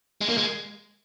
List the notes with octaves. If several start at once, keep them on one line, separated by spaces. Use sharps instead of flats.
G#3
A#3
G#3